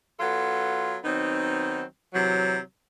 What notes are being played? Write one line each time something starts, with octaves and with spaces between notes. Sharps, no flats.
F#3 B3 F4 A4
D#3 F#3 B3 C4 D#4
C3 E3 F#3